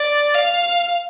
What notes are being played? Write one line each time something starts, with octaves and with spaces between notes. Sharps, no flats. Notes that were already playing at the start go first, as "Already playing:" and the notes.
Already playing: D5
F5